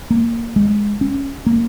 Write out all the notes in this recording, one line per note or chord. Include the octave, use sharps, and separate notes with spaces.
A#3
G#3
C#4
A#3